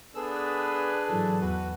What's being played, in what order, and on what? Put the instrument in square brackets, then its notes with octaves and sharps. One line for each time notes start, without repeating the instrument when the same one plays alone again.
[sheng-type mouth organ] B3 A4 E6 [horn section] D4 G#4 B4
[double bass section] G#2 E3 F#3 [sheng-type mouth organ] A4
[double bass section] E2 [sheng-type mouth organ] F#4 B4